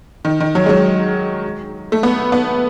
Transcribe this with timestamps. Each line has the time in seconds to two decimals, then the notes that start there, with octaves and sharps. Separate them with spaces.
0.25 D#3
0.40 D#3
0.55 F#3
0.66 G#3
0.69 F#3
1.92 A3
2.03 B3
2.32 B3